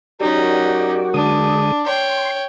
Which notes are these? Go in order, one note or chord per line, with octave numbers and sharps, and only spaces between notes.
F#3 C#4 D#4 F#4 G4 A#4 D5
D3 G#3 D4 D#6
C#5 G5 C6